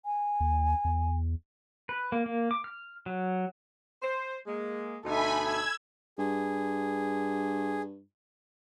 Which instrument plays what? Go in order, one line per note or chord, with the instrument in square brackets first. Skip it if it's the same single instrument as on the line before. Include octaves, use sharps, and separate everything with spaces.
[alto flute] G#5
[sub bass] D#2
E2
[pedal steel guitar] B4
A#3
A#3
D6
F6
F#3
[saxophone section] C5
G#3 A#3
[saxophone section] D2 B2 D#4 [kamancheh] A4 E5 [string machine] G#5 B5
[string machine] E6 G#6
[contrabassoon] G2 [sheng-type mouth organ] G#4